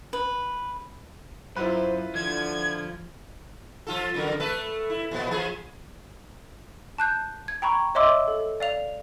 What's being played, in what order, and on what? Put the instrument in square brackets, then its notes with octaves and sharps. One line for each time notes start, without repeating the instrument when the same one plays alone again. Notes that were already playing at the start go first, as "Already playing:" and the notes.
[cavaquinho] B4
[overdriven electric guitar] F#2 [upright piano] E4 F4 B4 [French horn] C5
[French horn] D3 [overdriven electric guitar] F3 [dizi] G#6
[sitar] F3 F4 A4
F2 D3 A#4
A3 A4 B4
E4
A#2 F3 B3
F3 G#4
[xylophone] A5 F#6 G6
G#6
G5 A#5 B5 C#6
C#5 D#5 E5 C6 D6 E6
A4
D5 F5 F7